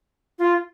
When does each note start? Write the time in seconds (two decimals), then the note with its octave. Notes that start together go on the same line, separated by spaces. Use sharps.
0.39 F4